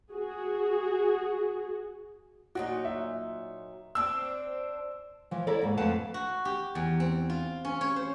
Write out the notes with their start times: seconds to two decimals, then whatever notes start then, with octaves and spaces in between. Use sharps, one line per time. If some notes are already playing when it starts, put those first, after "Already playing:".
0.11 F#4 G#4
2.55 A#2 F#3 D#4 F#4
2.85 E5
3.95 C4 D4 E6
5.31 E3 F3
5.47 E4 A4 A#4 C#5 D5
5.61 D#2 G#2
5.77 F2 A3 B4 F5 F#5 A5
6.14 F#4
6.45 G4
6.75 E2
7.00 C4
7.30 F4
7.65 C#4
7.81 C#5
7.96 C5